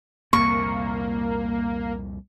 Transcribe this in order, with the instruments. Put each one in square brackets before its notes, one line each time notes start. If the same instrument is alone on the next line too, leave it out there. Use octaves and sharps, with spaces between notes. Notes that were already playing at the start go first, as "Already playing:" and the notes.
[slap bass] C2 F2 A#2 [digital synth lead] A#3 [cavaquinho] C#6